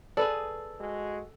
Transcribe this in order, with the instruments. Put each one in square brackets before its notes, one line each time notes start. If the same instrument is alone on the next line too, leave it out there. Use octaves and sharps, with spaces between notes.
[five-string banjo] G#4 B4 D5 [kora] A4
[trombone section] G#3 F#4